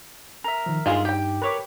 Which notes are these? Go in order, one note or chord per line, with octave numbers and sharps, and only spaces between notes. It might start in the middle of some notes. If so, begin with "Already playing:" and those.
A#4 E5
D#3 F3
G2 G#3 D#4 F4 G#4
G4 G5
A#4 B4 C#5 D6